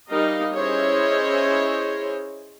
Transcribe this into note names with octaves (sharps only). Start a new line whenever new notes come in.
G3 D#4 A#4 D#5 F5
C#4 E4 G#4 C5 C#5 D#5